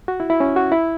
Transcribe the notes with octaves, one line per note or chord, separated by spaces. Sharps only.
F#4
E4
E4
C#4
F#4
E4